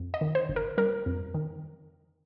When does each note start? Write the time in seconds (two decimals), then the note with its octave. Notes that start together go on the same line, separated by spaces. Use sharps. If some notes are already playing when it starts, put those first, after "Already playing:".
Already playing: F2
0.14 D#5
0.21 D#3
0.35 C5
0.49 G1
0.56 A#4
0.78 G3 A#4
1.06 F2
1.34 D#3